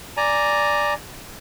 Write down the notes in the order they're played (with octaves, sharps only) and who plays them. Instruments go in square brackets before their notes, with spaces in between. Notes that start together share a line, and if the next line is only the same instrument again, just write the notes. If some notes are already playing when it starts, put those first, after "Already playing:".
[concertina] D5 G#5 A#5